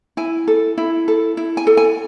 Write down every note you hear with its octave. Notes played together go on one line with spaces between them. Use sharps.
E4 G#5
A4
E4
A4
E4
G#5
A4
G#5